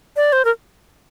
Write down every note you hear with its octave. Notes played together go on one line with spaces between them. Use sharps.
D5
C5
A#4